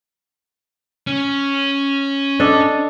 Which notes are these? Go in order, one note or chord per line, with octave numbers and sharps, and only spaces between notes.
C#4
D4 A4 D#5